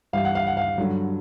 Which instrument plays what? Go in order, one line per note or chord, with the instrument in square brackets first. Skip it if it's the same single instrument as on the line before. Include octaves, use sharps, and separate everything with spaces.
[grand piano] G2 E3 G3 F5
F#5
F5
F#5
F5
G2 D3 F#3